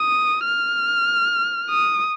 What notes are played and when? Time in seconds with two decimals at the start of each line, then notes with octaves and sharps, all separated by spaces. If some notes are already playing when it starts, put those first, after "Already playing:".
Already playing: D#6
0.45 F6
1.70 D#6